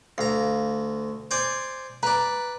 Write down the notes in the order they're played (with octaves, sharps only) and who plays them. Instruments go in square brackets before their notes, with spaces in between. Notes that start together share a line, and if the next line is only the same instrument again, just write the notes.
[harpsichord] D2 A#5 [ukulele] F5
[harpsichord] C5 D5 G#5
[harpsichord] B4 D5 [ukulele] A#5